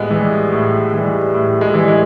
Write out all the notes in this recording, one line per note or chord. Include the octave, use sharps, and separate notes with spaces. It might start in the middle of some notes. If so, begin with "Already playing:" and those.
Already playing: A2 G3 G#3 B3
E3 G3
A2
E3 G3
A2
G#3
E3 G3
G#3